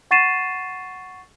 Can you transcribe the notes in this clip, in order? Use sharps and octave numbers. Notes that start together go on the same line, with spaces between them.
F#5 C#6 A6 C7 D#7 E7